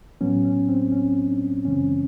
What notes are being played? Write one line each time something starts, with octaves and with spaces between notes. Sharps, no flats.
A2 F#3 B3 C#4
C#4
C4
C#4
D4
F#2 C#3 E3 G#3 C4 C#4